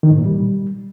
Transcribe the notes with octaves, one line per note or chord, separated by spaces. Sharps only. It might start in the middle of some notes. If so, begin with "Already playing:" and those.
D#3
G#2
A#2
G3